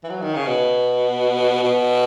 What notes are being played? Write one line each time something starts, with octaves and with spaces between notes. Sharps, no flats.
E3
F#3
D#3
C#3
B2
B2